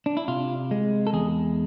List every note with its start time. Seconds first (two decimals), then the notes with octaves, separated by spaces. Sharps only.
0.06 D4
0.17 E4
0.28 C3 F4
0.71 G#3
1.07 A4
1.13 E2 G#4